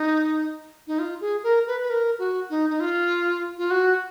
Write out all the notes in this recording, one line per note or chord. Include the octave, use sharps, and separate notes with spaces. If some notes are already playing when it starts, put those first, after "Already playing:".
Already playing: D#4
D#4
F4
G#4
A#4
B4
B4
A#4
F#4
D#4
D#4
F4
F4
F#4